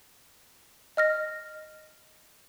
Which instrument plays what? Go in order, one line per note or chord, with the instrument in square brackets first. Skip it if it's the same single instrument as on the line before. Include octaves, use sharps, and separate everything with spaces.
[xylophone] D#5 F6 A#6